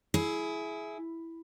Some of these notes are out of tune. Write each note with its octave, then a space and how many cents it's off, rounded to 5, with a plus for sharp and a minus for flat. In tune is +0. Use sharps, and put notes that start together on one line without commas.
E4 +0 G#4 +20